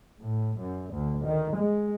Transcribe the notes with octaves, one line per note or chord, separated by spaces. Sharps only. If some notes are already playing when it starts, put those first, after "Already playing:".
A2
F#2
D2
D#3
G#3